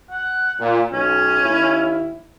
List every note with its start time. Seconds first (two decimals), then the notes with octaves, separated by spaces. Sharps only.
0.10 F#5
0.60 A#2
0.92 B1 C#4
1.43 D#2 E4